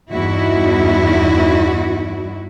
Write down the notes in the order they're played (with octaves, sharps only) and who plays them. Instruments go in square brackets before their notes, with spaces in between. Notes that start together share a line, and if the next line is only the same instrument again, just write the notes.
[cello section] E2 G2 D#4 E4 F#4